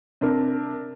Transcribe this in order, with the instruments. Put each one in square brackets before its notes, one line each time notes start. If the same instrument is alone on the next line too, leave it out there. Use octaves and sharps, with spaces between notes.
[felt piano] C3 D4 A#4